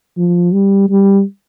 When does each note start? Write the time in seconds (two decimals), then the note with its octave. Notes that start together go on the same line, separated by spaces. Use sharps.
0.17 F3
0.53 G3
0.90 G3